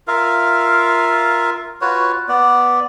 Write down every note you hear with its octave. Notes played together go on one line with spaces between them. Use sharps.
F4 A#4 E5 F5
F4 F#4 B4 C#5
B3 D5